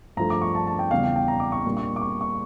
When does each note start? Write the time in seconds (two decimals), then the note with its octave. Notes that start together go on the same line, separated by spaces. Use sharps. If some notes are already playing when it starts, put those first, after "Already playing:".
0.17 G2 F3 A3 A#5
0.30 D6
0.42 C#6
0.55 A5
0.67 A5
0.79 G5
0.91 E2 C#3 G3 F5
1.03 G5
1.16 G5
1.28 A#5
1.40 D6
1.52 C#6
1.66 A#2 G3 A#3 D4
1.77 C#6
1.96 D6
2.02 C#6
2.21 C#6